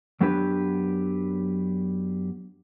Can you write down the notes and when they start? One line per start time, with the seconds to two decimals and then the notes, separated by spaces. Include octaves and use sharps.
0.21 F#2 F#3 B3 D4 G4 B4